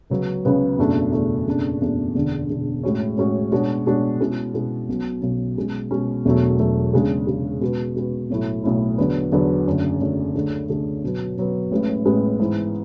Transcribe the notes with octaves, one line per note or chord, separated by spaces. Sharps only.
C#2 C#3 F#3 B3
C#2 C#3 F#3 B3
F#1 E2 B2 A3 D4
F#1 E2 B2 A3 D4
F#1 E2 B2 A3 D4
F#1 E2 B2 A3 D4
E1 E2 D3
E1 E2 D3
A2 G#3 C#4 F#4 C#5
A2 G#3 C#4 F#4 C#5
B2 G#3 D4 F#4 C#5
B2 G#3 D4 F#4 C#5
B2 G#3 C#4 E4 G#4
B2 G#3 C#4 E4 G#4
B1 B2 F#3 C#4
B1 B2 F#3 C#4
B2 G#3 C#4
B2 G#3 C#4
E1 E2 B2 F#3 A3
E1 E2 B2 F#3 A3
E2 C#3 G#3 D4 G#4
E2 C#3 G#3 D4 G#4
B2 G#3 C#4 F#4 B4
B2 G#3 C#4 F#4 B4
B1 A2 F#3 A3 E4
B1 A2 F#3 A3 E4
E2 D3 F#3 B3
E2 D3 F#3 B3
F#1 F#2 D3 A3
F#1 F#2 D3 A3
D2 D3 A3 D4 G#4
D2 D3 A3 D4 G#4
B2 F#3 B3
B2 F#3 B3
A1 A2 G#3 B3
A1 A2 G#3 B3
G#2 E3 B3